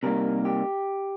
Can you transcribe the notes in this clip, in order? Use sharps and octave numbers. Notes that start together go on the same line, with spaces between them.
C3 G3 A#3 D#4 A#4
G4